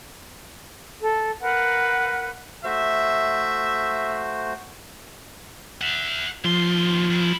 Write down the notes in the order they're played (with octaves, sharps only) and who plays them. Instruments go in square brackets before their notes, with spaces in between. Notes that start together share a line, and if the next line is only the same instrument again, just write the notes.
[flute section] A4
A#4 B4 F5 F#5
[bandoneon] A3 F#4 C5 [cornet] E5
[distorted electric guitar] E5 F#5
[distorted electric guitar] D#2 C6 [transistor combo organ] F3
[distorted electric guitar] F2 E4